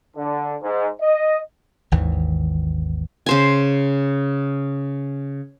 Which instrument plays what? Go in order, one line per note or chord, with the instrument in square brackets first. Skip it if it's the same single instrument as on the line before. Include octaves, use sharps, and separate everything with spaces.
[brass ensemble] D3
G#2
D#5
[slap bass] G#1 D#2 D#3 E3
[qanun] C#3 C5 G#5